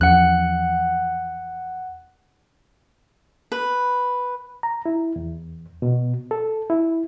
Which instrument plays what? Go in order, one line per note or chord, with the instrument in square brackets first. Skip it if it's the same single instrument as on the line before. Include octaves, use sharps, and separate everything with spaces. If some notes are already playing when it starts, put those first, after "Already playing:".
[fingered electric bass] E2 F3 C#4 [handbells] F#5 F#6
[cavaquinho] B4
[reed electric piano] A#5
E4
E2
B2
A4
E4